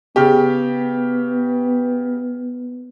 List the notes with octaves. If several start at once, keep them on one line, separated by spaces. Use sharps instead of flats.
C#3 B3 G4